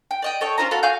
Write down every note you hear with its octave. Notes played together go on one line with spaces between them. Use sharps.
G5
D5 D#5 G5
A4 C#5 D#5 G5
C#4 F4 C5 A#5
F#4 A4 F5 B5
F#4 F5 G#5 G6